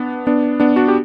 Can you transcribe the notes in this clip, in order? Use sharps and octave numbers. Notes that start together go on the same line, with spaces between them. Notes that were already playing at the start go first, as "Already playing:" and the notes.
Already playing: B3 D4
B3 D4
B3 D4
D4 F#4
G4